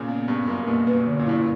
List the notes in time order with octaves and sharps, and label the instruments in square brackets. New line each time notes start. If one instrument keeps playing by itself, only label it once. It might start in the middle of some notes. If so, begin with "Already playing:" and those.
Already playing: [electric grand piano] A#2 C#3
[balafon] B3
[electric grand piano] G2 [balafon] B3
[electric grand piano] F#2 A#2 [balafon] A#4
[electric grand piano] G2 B2 [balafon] A#3
[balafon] B4
[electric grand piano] G2 B2
[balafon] D3
[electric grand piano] F#2 A#2
[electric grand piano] G2 [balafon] E4
[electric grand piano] A#2